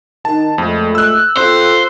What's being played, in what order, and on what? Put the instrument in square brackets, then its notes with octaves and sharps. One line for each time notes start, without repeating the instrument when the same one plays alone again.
[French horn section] D#3 [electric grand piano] A5
[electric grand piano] F2 [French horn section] A#2 G#3 A3
[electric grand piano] E6 F#6
[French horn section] C4 F4 A4 [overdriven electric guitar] C5